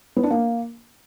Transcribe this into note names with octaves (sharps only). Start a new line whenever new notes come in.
B3
D4
A#3